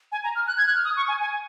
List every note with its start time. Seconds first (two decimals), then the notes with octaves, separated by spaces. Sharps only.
0.12 G#5
0.24 A#5
0.36 F6
0.47 F#6
0.58 G#6
0.66 F#6
0.76 F6
0.85 D#6
0.97 C#6
1.08 G#5
1.20 G#5